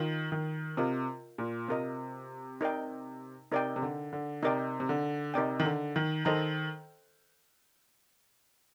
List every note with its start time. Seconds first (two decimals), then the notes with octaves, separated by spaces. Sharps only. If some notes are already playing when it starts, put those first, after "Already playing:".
Already playing: D#3 F4 A#4 D#5
0.32 D#3
0.77 C3 F4 A#4 D#5
1.38 A#2
1.68 C3 F4 A#4 D#5
2.61 D#4 A#4 D5 G5
3.52 C3 D#4 A#4 D5 G5
3.76 C3
3.82 D3
4.13 D3
4.43 C3 D#4 A#4 D5 G5
4.80 C3
4.89 D3
5.34 C3 D#4 A#4 D5 G5
5.60 D#3
5.65 D3
5.96 D#3
6.25 D#3 A4 C5 D#5 A#5